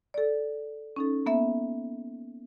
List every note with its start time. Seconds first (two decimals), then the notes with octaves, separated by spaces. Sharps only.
0.14 A4 D5
0.96 C#4 D#4 A4
1.26 A#3 B3 E5